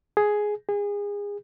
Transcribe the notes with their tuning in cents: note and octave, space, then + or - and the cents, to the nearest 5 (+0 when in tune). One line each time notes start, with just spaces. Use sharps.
G#4 +5
G#4 -30